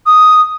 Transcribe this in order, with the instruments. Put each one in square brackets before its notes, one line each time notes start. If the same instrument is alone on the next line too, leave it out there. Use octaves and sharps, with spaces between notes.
[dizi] D#6